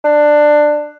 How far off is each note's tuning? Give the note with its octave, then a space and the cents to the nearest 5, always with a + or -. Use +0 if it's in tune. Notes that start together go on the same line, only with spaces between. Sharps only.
D4 +15